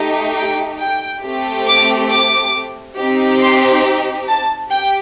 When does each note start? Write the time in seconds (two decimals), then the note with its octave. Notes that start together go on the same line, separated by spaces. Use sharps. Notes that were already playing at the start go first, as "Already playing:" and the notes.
Already playing: A3 D#4 G4
0.38 G5
0.80 G5
1.24 A3 C4 G4
1.67 D6
2.11 D6
2.98 C4 D#4 G4
3.41 C6
4.28 A5
4.71 G4 G5